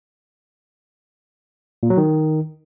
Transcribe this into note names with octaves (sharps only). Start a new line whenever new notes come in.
A#2
F#3
D#3